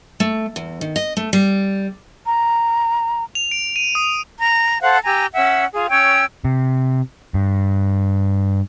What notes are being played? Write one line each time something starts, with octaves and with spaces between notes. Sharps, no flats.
A3
E2
D#3
D#5
A3
G3
A#5
F7
D7
D#7
D#6
A#5
A4 C5 F5 F#5
G4 G#5 A#5 E6
C#4 E5 F#5 E6
F4 G#4
C#4 C#5 G5 E6
C3
G2